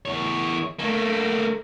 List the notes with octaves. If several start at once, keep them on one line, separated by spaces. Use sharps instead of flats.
E2 C#5
A3 A#3